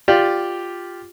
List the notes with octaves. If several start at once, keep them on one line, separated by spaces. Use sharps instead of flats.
F4 G4 D5